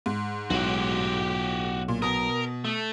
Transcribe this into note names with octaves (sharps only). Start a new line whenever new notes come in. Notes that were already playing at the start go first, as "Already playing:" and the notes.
G#2
B1 A2 F#4 G4
A#2
B2 A#4 D#6
A3